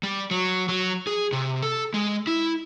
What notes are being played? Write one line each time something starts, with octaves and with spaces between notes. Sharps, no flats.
G3
F#3
F#3
G#4
C3
A4
G#3
E4